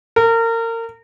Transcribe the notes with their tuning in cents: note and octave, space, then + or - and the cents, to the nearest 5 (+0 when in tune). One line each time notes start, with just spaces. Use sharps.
A#4 -30